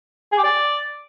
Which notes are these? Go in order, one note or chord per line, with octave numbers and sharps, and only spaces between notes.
G#4
G4
D5